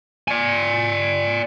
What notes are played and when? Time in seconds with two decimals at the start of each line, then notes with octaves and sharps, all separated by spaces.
0.28 D5 G#5